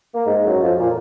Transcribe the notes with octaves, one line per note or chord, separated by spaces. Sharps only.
A#3
G#2 G#3
F#2 F#3
F2 F3
A#2